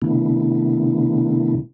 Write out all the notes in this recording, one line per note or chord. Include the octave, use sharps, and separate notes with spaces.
C3 D#3 A3 B3 D4 E4